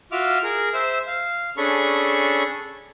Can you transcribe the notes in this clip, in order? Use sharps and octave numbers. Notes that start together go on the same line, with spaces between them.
F4 F#4 E5 D6 F6
G#4 A#4
C5 E5 E6
F5
C#4 D4 G#4 A4 B5 C#6